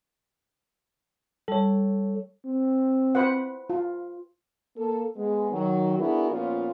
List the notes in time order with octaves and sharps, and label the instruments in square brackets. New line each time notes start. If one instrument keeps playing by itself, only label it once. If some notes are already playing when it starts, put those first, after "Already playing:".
[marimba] G3 A5 [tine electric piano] A4 C#5
[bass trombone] C4
[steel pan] B4 C5 F#5
F4
[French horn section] A#3 A4
G#3 B3
D#3 F#3
B3 D4 E4 F#4 G#4 A#4
A#2 F3 B3 C#4 F4